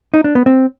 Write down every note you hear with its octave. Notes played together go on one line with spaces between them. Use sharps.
D#4
D4
B3
C4